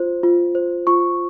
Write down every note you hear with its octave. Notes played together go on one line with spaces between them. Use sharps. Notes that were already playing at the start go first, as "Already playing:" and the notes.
Already playing: F4 C5
F4
C5
F4 C#6